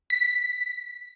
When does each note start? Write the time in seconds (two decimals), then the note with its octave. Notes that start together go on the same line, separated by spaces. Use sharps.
0.10 B6